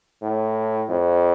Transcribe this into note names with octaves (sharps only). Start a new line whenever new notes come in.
A2
F2